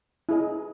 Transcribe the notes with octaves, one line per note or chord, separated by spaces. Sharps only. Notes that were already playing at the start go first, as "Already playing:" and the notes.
E4 G#4 D#5